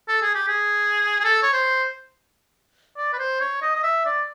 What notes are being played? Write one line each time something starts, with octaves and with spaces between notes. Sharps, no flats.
A4
G#4
G4
G#4
G#4
A4
C#5
C5
D5
B4
C5
C#5
D#5
D#5
E5
D5